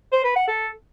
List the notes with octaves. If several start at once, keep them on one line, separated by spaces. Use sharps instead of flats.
C5
B4
F#5
A4